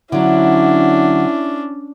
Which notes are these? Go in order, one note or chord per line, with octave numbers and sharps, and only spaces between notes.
D3 F#3 C#4 D4 E4